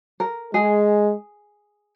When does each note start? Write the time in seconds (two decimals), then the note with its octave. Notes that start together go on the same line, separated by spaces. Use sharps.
0.20 A#4
0.54 G#3 G#4